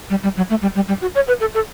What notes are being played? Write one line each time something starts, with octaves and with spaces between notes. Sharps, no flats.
G3
G3
F#3
A3
G3
G3
G3
F#4
C#5
B4
A4
A4